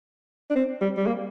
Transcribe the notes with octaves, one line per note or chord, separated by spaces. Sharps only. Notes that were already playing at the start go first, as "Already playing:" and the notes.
D4
C4
G3
G3
A#3